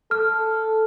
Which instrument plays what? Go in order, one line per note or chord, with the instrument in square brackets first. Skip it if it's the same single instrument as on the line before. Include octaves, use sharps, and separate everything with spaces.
[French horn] A4 [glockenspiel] F6